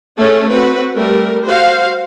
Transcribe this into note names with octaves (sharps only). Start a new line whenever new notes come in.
A3 C#4 G#4 A4
C4 F#4 B4
G3 A3 A#4
F#4 C5 F5